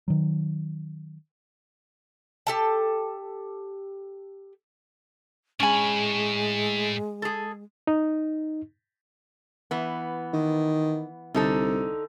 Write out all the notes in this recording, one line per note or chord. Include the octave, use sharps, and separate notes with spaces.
D#3 F#3
G4 A4 A5
A2 G#3 C#4 G#5 B5
G#4 A4
D#4
E3 B3
D#3
C2 D3 D#4 A4